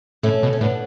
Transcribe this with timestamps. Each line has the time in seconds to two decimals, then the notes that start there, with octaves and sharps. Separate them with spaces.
0.23 A2 A3 C#4
0.43 B2
0.53 C#4
0.61 A2 B3 D4